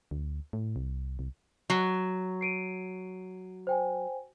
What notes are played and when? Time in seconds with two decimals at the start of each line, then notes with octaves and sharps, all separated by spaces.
0.11 D2
0.53 A2
0.76 C2
1.19 C2
1.70 F#3
2.41 C7 D7 D#7
3.67 C5 G5 G#5